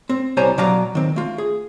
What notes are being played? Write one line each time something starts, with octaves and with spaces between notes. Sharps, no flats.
C4
C2 G3 C5 C#5 G#5 A#5
B2 F#3 D5 F5 A#5
D#3 C4
A3 F4
G#4